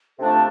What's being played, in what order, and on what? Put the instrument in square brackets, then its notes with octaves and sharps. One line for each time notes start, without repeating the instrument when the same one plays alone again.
[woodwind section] C3 F3 A3 D4 [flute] A4